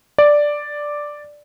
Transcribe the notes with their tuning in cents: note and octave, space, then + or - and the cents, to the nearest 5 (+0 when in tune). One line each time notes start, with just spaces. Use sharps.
D5 +0